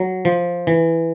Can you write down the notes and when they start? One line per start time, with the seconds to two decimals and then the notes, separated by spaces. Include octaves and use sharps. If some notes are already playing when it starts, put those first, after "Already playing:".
Already playing: F#3
0.25 F3
0.67 E3